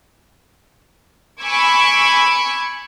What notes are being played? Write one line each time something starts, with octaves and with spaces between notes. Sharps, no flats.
G#5 B5 C#6 D6 E6 G#6